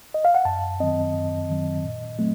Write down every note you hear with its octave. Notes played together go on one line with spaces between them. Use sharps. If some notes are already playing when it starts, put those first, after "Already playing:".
D#5
F5
F#5
F#2 A5
D#3 F#3 C4 D#5
F#2
D#3 F#3 C4
A#2
F#3 A3 C4